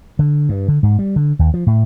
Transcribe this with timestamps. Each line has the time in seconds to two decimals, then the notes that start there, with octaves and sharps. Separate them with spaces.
0.19 D3
0.49 G2
0.68 D3
0.83 G#2
0.99 G3
1.16 D3
1.39 D#2
1.54 F3
1.67 A2